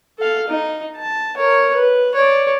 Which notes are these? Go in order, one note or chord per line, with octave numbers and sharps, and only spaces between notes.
A4 F5
D#4
A5
A#4 C#5
B4
C#5 D5